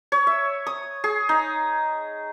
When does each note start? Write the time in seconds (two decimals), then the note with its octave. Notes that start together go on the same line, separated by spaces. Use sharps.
0.12 C#5
0.27 E5
0.67 D#6
1.04 G#4
1.29 D#4